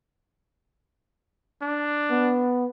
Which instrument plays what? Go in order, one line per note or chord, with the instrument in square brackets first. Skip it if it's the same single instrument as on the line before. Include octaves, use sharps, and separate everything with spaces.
[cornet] D4
[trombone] B3